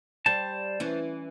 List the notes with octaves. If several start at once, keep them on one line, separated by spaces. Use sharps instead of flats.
G3 C5 A5
E3 C#4